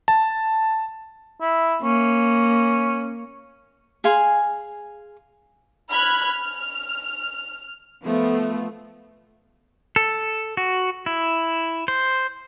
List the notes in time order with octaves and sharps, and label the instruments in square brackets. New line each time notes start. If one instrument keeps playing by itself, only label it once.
[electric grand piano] A5
[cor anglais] E4
[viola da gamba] A#3 [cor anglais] C#4
[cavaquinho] G#4 F5 G#5 C6
[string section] B5 F6 F#6 G#6
F6
F3 A3 B3
[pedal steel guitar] A4
F#4
E4
C5